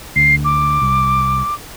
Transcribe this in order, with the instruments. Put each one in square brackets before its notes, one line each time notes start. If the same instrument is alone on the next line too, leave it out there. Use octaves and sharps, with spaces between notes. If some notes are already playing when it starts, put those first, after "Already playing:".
[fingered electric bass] D2 [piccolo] C7
[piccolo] D6
[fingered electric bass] C2